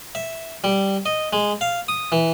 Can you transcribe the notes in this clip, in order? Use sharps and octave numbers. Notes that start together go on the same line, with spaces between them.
E5
G3
D#5
G#3
F5
D#6
E3